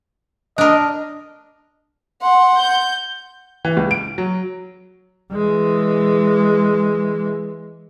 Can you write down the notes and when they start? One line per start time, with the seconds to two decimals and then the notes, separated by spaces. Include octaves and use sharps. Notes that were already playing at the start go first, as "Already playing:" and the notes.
0.58 D4 A#4 D#5
2.22 F#5 C6
2.57 G6
3.65 E3
3.77 C#2
3.91 D7
4.18 F#3
5.32 E3 G#3